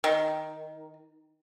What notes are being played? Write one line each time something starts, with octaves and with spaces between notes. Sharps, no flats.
D#3